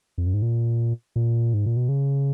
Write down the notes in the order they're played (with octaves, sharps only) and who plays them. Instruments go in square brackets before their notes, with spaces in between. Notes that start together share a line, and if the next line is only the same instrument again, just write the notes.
[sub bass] F2
F#2
G#2
A#2
A#2
G#2
A#2
B2
C#3